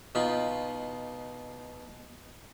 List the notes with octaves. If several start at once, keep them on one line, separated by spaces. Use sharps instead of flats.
B2 D#4 F4 B5